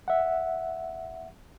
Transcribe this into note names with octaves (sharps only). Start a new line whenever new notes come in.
E5 F#5